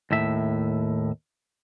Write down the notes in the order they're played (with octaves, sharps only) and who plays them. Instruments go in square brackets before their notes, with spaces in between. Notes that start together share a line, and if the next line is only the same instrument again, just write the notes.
[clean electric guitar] D#2 A2 E5